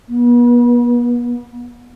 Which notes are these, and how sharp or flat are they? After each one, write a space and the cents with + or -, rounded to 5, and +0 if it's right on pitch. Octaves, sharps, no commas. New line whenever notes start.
B3 -40